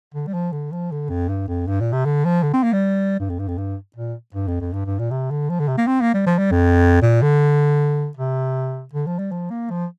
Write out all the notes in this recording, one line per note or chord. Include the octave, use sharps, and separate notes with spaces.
D3
G3
F3
D3
F3
D3
F2
G2
F2
G2
A#2
C3
D3
F3
D3
C4
A#3
G3
G2
F2
G2
F2
G2
A#2
G2
F2
F2
G2
G2
A#2
C3
D3
F3
D3
C3
A#3
C4
A#3
G3
F3
G3
F2
A#2
D3
C3
D3
F3
G3
F3
A#3
F3